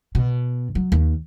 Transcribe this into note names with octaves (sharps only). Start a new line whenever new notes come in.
B2
F#3
D#2